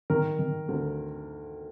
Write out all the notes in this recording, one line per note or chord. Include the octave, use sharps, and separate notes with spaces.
D#3 A#4
D#3
D2